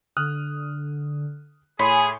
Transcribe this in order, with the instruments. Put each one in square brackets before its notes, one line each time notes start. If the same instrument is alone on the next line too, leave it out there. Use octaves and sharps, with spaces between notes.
[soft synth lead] D3 [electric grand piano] D#6 F6 F#6
[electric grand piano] A2 C#5 C6 [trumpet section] G#4 [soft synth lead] G#5 [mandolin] B5